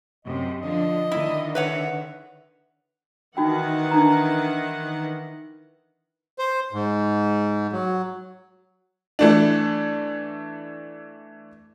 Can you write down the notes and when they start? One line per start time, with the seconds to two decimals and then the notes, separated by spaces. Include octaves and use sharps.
0.25 F#2 C3 D#5
0.62 D3 F3 D4 D#5
1.11 D3 D#3 E4
1.55 B4 C#5 E5 F#5
3.37 D#3 E3 D#4 F#4 F#5 G5
3.91 D4 D#4 A#5
6.39 C5
6.73 G#2
7.73 F#3
9.19 E3 A3 D4